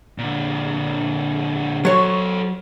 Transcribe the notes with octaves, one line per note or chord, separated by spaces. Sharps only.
A#2 D3
F#3 A4 C5 C#5